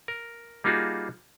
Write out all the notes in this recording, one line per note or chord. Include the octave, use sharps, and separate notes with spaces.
A#4
G3 A#3 D#4 F4 F#4 G#4